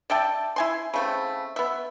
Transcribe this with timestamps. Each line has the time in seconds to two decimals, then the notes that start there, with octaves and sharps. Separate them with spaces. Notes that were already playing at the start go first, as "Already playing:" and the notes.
0.10 D5 E5 G5 A5
0.56 E4 G#5 C6
0.94 C#3 A3 C4
1.56 B3 E5